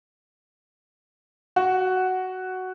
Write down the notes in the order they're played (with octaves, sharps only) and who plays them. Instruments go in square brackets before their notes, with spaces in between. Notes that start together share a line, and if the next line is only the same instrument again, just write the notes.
[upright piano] F#4